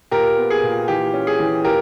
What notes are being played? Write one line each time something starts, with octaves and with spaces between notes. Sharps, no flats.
A#2 G4 A#4
B3
G#4
A#2
E3 G4
C#4
G#4
E3
A#2 G4 A#4